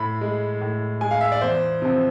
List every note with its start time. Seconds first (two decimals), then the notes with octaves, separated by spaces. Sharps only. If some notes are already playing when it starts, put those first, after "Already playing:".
Already playing: A2 B5
0.21 G#3
0.61 A2
1.01 G#3 G#5
1.11 F5
1.21 E5
1.32 D5
1.42 E2 C5
1.82 C3 F3